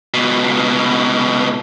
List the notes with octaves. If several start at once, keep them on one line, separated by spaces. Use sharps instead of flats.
C#2 B2